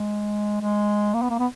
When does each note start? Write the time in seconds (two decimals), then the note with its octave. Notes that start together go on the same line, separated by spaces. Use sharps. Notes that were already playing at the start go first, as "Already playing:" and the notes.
Already playing: G#3
0.61 G#3
1.14 A#3
1.22 B3
1.30 A#3
1.39 B3